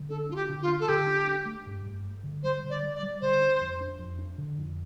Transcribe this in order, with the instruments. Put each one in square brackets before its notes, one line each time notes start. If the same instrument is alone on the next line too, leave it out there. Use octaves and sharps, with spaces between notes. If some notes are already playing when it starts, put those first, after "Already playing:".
Already playing: [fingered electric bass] D3
[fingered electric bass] D4 [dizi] A4
[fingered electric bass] D4 [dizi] F4
[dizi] G4
[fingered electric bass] D3
[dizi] F4
[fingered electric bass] D4
[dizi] A4
[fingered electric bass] D3 [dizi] G4
[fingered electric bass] D4
D4
A3
G2
G2
A3
D3
[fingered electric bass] G3 [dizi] C5
[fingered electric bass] D3
[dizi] D5
[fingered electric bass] G3
[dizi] D5
[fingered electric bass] G3
[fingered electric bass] D3 [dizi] C5
[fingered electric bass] D4
F2
D4
F2
D4
D3
F2